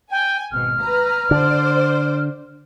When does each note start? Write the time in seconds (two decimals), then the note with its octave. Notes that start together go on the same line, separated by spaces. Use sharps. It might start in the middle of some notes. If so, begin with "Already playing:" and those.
0.11 G5 G#5
0.52 G#1 B2 F6
0.81 B4 A#5
1.31 D3 C5 D5